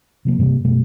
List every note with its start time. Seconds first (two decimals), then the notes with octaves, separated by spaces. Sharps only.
0.25 C3 F3 A#3
0.39 G2 C3 G3 A#3
0.64 F#1 B2 G3 A3